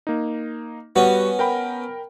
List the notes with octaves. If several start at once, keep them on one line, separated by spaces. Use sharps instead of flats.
A#3 D#4
G3 B3 C#4 F#4
A#4 G5 B5